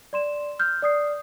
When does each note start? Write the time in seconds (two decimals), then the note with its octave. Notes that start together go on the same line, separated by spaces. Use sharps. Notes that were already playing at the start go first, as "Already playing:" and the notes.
0.13 D5 C6 E7
0.59 F6 G6
0.82 D5 D#6 C7